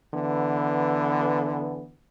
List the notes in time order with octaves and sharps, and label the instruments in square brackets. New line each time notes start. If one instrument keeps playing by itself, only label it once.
[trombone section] D3 E3 B3